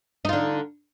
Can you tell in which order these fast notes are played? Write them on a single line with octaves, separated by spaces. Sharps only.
D#4 F4 D3